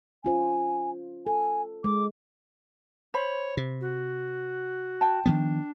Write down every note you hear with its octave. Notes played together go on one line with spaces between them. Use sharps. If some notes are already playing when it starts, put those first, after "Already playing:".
C#4 F4 C5 G#5
A4 G#5
G#3 D6
C5 C#5 B5
C3
F#4
G5 A5
D#3 F3 B3 D4